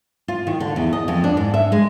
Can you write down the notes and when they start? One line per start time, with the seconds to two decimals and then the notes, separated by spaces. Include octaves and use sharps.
0.28 F4
0.47 D#3
0.60 D3
0.76 E2
0.93 D#5
1.08 F2
1.24 D4
1.37 G#2
1.54 E5
1.72 G#3